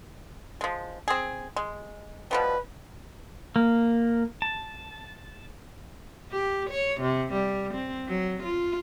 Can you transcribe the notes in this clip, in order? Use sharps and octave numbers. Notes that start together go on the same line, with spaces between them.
F3 G#3
C4 G#4
G#3
B2 F3 G3 B4
A#3
A5
G4
C#5
C3
G3
C4
F#3
F4